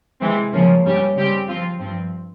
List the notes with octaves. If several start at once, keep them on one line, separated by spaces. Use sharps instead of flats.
C3 E3 G#3 C4
C#3 F3 A#3 C#4
G2 G3 C#4 G4
C#3 G3 C4 G4
F3 C4 F4
G2 F3 C4